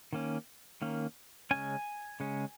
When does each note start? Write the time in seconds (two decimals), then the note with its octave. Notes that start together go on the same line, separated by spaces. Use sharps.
0.13 D#3 A#3 C#4
0.82 D#3 A#3 C#4
1.51 C#3 G#3 C#4 G#5
2.20 C#3 G#3 C#4